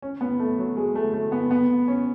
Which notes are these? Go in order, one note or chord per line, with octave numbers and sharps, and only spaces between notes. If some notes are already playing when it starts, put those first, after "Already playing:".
C#4
B3
A3
F#3
G#3
A3
A3
B3
B3
C#4